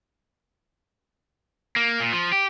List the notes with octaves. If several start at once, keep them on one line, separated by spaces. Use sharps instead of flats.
A#3
A#2
F3
G4